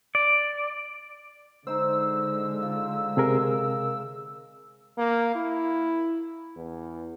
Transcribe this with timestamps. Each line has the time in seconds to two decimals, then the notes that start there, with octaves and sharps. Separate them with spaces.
0.15 D5
1.67 D3 G#3 D#4 C5 E6
2.63 F4
3.17 C3 G#4 A#4
4.98 A#3
5.35 E4
6.56 E2